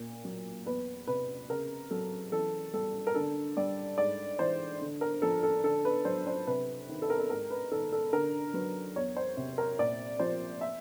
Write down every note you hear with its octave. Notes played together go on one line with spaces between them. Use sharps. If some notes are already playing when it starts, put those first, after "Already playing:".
Already playing: A#2
F#3
E2 B4
C3 B4
C#3 A#4
F#3 A4
E3 A4
G3 A4
A#4
D3 A4
G3 D5
G#2 D5
E3 C5
D3
A#4
F3 A4
A4
D3 A4
B4
F#3 C5
C5
C3 B4
D#3
A4
A#4
A4
G#2 A#4
B4
D#3 A4
A4
D3 A#4
F#3 B4
E2 C#5
C5
C3
A#4
A#2 D5
F3 C5
E5